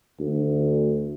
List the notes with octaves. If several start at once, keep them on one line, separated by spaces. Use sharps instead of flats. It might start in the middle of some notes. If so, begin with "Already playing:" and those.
D2